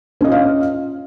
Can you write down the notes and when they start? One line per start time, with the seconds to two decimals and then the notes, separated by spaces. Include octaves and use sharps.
0.21 C#4
0.24 D#5
0.28 F4
0.32 F5